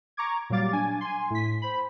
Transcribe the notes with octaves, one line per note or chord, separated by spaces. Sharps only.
A#5 C#6 D6 G#6
A#2 F#3 G3 F5 D6 A6
D4 G#5
G#5 C6
A2 B6
C5 B5